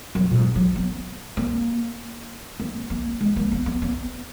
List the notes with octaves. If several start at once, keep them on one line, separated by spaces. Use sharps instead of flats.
F#2
A#2
G#2
F#3
B3
A#3
A#3
A#3
G#3
A#3
B3
B3
B3